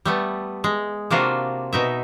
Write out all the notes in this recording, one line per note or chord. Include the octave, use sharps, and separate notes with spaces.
G3 A3 B3
G#3
C3 A#3 D4 F4 F#4
B2 D#4 E5